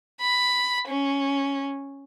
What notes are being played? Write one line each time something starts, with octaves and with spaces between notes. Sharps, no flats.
B5
C#4